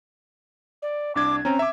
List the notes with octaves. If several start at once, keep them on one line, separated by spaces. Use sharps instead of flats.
D5
C2 D4 D6 G#6
C4 C#4 A#5
E5 D6